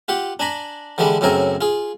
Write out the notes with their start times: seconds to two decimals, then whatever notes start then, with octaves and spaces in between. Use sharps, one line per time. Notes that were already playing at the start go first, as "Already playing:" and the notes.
0.08 F4 G4 F#5
0.40 D4 G#5 A#5 B5
0.98 D3 E3 G3 G#3 D4
1.21 F#2 A2 C#3 C4 A#4 G#5
1.61 F4 G#4